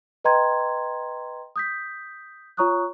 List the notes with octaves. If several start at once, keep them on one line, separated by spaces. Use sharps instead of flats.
B4 D#5 G5 A#5 C6 G#6
D#6 G6 B6
F4 C#5 A#5 C#6 D#6 F#6